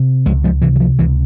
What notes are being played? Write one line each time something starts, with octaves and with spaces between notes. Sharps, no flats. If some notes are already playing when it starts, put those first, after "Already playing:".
Already playing: C3
C#2 F3 G#3
F3 G#3
C3 E3
E3
F3
C#2 E3